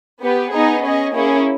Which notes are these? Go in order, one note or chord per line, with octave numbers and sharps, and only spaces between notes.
B3 G4 B4
B3 D#4 G#4 D#5
C#4 G#4 D#5
A#3 C#4 E4 G#4